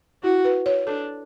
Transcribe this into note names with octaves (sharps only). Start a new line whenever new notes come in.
E4 F#4
B4
C#5
D4 A4